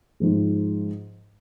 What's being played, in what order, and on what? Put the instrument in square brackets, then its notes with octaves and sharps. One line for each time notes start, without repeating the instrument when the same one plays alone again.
[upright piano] G#2 F3 G#3